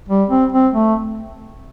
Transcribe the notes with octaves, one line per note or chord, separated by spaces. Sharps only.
G3
C4
C4
A3